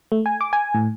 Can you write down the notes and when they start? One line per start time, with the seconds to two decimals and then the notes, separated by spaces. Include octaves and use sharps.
0.12 A3
0.26 G#5
0.41 D6
0.53 G#5
0.74 A2